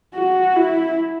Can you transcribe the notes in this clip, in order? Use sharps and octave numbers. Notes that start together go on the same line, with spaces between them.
F#4
E4